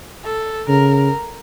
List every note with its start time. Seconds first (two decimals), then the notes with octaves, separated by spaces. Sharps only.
0.24 A4
0.68 C#3 A#4